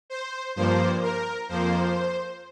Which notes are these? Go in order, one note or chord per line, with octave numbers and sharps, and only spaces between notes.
C5
G2 F3 A#3 C5
A#4
F2 F3 A#3 C5